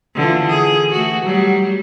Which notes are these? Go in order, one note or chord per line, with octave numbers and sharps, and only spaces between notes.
D3 E3 F4
G#4
A3 F#4
F#3 G3